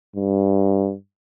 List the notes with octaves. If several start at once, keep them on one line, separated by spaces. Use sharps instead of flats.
G2